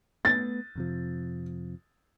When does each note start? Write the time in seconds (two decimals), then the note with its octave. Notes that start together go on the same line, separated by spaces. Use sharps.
0.25 A3 B3 A6
0.75 F2 C3 F3